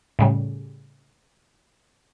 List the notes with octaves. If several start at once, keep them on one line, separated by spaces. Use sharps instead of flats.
A2 C#3 G3